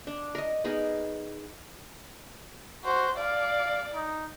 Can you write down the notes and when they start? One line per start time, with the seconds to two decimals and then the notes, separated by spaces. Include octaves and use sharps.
0.07 D4
0.35 A#4 D#5
0.64 B3 D#4 G#4 A#4
2.85 F#4 C5
3.17 D5 F5
3.95 D#4